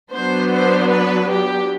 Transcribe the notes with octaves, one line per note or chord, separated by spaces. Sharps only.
F#3 B3 D4 C5
C5
B4
G4